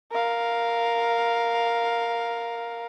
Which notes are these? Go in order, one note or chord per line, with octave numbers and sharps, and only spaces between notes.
A#4 F5